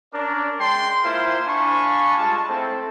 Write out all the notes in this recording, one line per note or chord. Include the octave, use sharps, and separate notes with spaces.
C#4 D4 A#4 D5
G#3 G5 A5 C6
A#3 E4 F4 A#4 C5
D4 F5 G#5 A5 B5 C#6
G3 G#3 F4 A5
A3 C4 E4 A4